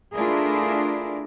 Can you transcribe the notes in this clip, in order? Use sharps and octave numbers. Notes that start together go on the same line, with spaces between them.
A3 D4 E4 F4 G#4 A#4